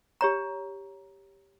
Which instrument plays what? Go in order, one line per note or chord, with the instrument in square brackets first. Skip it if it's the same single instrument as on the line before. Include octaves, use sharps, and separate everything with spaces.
[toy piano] G4 C#5 A#5